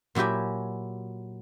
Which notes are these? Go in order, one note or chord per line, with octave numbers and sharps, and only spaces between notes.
A#2 F#3 E4 G4 G#5